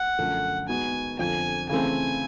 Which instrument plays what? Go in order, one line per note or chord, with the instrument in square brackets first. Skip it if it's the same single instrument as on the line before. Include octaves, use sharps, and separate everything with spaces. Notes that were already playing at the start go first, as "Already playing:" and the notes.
Already playing: [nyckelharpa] F#5
[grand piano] F#2 D3 F3 A3
[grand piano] G#3 B3 D#4 F#4 [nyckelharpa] G#5
[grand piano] F2 D3 F3 [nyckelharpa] G#5
[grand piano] C#3 E3 A3 C4 [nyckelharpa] G#5